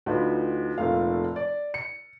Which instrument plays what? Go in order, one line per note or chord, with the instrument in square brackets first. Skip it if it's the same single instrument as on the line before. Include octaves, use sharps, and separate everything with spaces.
[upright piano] D2 D#4 F4 B4
F1 A#2 A3 F5
D5
C#7